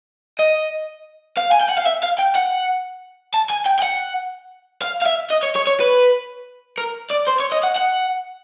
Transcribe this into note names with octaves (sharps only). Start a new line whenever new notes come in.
D#5
F5
G#5
G5
F#5
F5
E5
F5
G5
F#5
A5
G#5
G5
G5
F#5
F5
F5
E5
D#5
C#5
C#5
C#5
B4
A#4
D5
C5
C#5
D#5
F#5
F#5